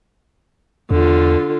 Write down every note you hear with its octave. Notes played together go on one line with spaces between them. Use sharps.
E2 D3 F4